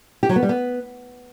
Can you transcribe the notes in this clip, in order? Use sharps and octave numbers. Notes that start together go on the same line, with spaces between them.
G4
F#3
B3
G3
B3